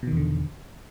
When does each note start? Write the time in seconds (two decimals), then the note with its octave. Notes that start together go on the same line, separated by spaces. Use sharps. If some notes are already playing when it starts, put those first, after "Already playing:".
0.03 B2
0.07 D#3
0.12 E2
0.17 D3